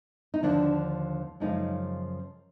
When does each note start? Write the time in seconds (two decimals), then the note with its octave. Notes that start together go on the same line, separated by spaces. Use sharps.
0.34 D#4
0.43 D#2 D3 F3 D4
1.40 F#2 C#3 F3 G#3 D#4